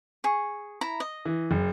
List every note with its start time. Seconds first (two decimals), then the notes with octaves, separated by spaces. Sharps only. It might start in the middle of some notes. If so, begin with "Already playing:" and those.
0.24 G#4 C#6
0.81 E4 A#5
1.00 D#5
1.25 E3
1.51 F#1